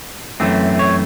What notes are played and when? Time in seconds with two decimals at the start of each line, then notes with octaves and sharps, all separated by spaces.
0.40 F#2 E3 A3 C4
0.79 C#5